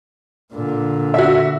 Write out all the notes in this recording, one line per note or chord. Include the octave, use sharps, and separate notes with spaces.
A#2 D3
F#4 E5